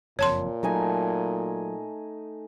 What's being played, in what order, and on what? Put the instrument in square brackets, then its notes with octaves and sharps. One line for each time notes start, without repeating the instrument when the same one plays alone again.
[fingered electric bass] F#1 F2 [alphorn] A#2 [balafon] C#5 A5 C6
[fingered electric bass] F#3 [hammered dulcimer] A3 D#4 G#5